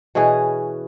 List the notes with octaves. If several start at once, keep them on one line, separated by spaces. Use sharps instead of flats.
B2 E3 C#4 G#4